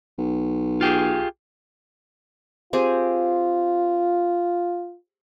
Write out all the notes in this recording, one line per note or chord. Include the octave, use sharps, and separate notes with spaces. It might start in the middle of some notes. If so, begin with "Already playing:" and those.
B1
F4 G4 G#4
C4 F4 G4 G#4